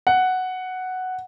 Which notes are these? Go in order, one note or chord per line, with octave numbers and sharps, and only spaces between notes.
F#5